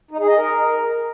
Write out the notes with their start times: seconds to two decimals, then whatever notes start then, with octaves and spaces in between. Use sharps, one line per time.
0.11 D#4
0.20 G#4
0.28 D#5
0.37 A#4